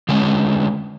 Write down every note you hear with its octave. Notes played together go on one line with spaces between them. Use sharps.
D3 G#3 C#4